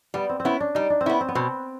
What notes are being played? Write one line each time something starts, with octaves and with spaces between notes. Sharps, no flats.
G3 B3
C4
C4
B3 C#4 E4
D4
G3 D#4
D4
C4
B3 C#4 E4
C4
B3
B2 C4